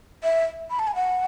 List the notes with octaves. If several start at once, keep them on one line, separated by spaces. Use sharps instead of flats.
E5
B5
A5
G#5
F#5